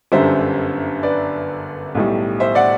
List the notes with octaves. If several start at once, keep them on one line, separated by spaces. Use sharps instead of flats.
G1 F#2 D3 G3 C5 E5
B4 D5
B1 A2 G3
C5 E5
D5 F#5